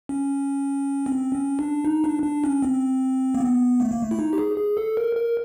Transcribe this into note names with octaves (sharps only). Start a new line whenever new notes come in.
C#4
C4
C#4
D4
D#4
D4
D4
C#4
C4
A#3
B3
A3
A#3
A3
E4
D#4
G4
G#4
G#4
A4
A#4
A#4